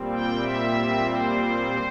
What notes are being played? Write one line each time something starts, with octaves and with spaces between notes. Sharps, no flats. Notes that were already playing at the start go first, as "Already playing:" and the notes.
Already playing: A#2 G3 C4
G5
E5
C5